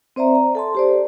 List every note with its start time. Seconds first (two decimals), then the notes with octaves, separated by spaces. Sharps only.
0.16 C4 C5 D5 E5 A#5
0.35 A#5
0.55 A4 A5 C6
0.75 G4 C5 D5